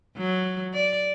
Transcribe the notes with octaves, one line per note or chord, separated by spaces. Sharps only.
F#3
D5